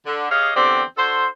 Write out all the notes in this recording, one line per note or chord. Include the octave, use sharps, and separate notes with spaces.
D3
G4 G#4 C#5 D#5 F5
E2 D3 G3 C4 G4 D5
D4 F#4 A4 C5